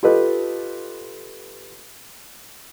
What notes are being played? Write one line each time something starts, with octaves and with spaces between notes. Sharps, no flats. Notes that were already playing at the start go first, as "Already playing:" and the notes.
F4 G4 A4 B4 D#5